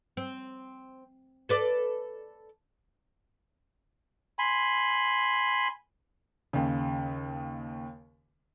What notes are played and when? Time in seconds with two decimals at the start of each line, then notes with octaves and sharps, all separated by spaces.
0.17 C4
1.49 A4 B4 D5
4.39 G#5 B5 C6
6.53 D#2 C#3